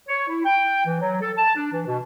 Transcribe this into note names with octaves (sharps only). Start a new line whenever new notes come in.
C#5
E4
G5
E3
F#3
A4
A5
D4
E3
B2